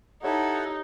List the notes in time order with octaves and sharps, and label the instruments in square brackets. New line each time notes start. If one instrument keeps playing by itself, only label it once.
[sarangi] D#4 [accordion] E4 A4 F#5 [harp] G4 C#5 E5